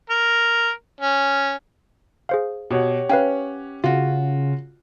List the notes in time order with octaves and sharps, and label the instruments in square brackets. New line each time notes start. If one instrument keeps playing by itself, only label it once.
[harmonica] A#4
C#4
[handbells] G#4 C5 F5
[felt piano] B2 [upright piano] G4 C#5 F#5
[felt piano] C#4 [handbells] B4 F5 G5
[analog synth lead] C#3 [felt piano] F4 F#4